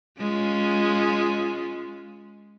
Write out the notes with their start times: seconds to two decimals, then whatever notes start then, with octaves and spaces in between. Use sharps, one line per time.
0.20 G#3 C#4 F4